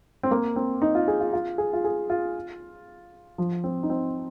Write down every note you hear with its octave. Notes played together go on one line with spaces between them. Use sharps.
C4
A#3
C4
D#4
F4
G#4
F4
F4
G#4
F4
G#4
F4
F3
C4
D#4
C4